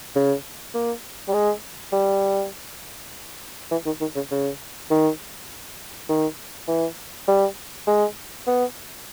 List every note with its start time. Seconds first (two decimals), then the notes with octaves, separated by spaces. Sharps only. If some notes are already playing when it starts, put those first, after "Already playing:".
0.15 C#3
0.74 A#3
1.28 G3
1.33 G#3
1.93 G3
3.71 E3
3.86 D#3
4.01 D#3
4.16 C#3
4.31 C#3
4.91 D#3
6.09 D#3
6.68 E3
7.28 G3
7.87 G#3
8.47 B3